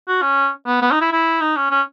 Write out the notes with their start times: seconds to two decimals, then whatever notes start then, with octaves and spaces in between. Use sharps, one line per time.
0.08 F#4
0.22 C#4
0.66 B3
0.82 B3
0.92 D#4
1.01 E4
1.12 E4
1.41 D#4
1.56 C#4
1.71 C#4